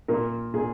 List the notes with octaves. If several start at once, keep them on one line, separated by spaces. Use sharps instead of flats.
A#2 A#4
A#2 G#4